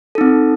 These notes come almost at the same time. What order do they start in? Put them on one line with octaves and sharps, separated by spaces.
A4 D#4 C4